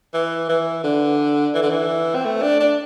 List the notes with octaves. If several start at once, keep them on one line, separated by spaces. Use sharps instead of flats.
E3
E3
D3
E3
D3
E3
C4
A3
D4
D4